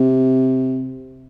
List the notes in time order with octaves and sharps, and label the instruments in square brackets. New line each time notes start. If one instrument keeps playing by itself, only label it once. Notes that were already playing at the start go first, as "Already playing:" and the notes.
Already playing: [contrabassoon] C3